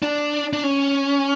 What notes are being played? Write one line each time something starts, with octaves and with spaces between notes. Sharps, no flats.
D4
D4
C#4